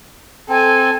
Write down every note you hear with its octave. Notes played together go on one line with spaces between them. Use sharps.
C4 A4 G#5